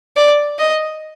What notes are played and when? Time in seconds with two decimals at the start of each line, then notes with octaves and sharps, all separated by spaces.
0.16 D5
0.59 D#5